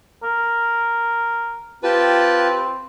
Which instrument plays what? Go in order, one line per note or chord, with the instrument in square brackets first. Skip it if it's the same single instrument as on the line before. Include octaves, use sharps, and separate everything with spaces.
[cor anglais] A#4
[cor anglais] C4 [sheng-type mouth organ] F4 G4 A5 [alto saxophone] B4